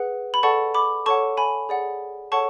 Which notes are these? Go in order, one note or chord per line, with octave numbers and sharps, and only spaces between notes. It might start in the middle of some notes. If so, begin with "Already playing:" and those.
Already playing: G#4 B4 F#5
B5
A4 D5 F#5 A5 C#6
B5 D6
A4 C#5 F#5 A5 C#6
G#5 B5
G#4 D5 F#5
A4 C#5 F#5 A5 C#6